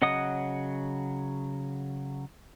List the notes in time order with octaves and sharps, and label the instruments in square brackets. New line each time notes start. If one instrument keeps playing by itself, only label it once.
[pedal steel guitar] C#3 F#3 D#5 F#5 D#6